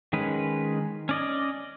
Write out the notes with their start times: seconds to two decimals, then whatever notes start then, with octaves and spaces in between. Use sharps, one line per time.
0.13 D#3 G#3 C#4 B4
1.09 C#4 D5 D#5